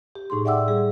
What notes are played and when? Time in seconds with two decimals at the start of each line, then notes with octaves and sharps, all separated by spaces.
0.15 G4
0.30 A2 D#4 G#4 C6
0.45 D5 E5 F#5 G5 D6 E6
0.68 G3 G#4